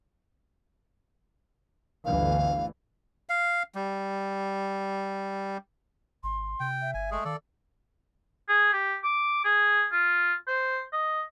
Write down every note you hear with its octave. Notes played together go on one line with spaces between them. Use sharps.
G1 D2 E3 F5
F5
G3
G#1 C6
C3 G5
E5
G1 G#5
G#3 A3 G#4
D#3 A4 D5 F5
G#4
G4
D6
G#4
F4
C5
D#5